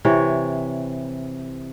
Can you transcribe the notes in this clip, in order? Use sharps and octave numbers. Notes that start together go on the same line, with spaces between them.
C3 E3 C#5